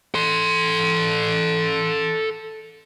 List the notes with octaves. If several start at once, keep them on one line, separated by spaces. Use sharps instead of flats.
A4 C6